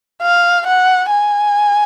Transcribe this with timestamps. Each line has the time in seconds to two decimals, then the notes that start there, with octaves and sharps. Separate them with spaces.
0.22 F5
0.67 F#5
1.10 G#5